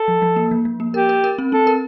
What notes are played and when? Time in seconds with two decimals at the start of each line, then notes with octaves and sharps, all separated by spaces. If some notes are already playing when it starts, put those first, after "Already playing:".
Already playing: A4
0.08 F3
0.22 F3
0.36 A#3
0.51 F3
0.65 F3
0.80 A#3
0.94 G4 A#4
1.09 A#4
1.24 A#4
1.38 C4
1.52 C4 A4
1.67 A#4